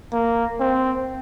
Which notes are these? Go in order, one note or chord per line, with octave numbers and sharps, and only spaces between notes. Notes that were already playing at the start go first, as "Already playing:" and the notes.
A#3
C4